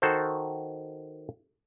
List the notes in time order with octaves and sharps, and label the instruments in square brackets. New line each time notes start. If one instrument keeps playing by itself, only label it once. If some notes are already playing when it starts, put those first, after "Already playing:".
[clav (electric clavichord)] D#3 F#4 A4 C5